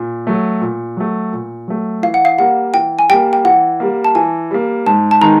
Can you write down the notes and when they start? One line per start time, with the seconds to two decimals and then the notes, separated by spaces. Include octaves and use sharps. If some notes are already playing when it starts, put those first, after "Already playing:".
Already playing: A#2
0.27 F#3 A3
0.61 A#2
0.97 F#3 A3
1.33 A#2
1.68 F#3 A3
2.03 E3 F5
2.14 F#5
2.25 F5
2.38 G3 A#3 F#5
2.74 E3 G5
2.99 G#5
3.09 G3 A#3 G5
3.33 G5
3.45 E3 F#5
3.80 G3 A#3
4.04 A5
4.15 E3 G#5
4.51 G3 A#3
4.86 G#2 A5
5.11 A5
5.21 D#3 G#3 B3 D#4 A#5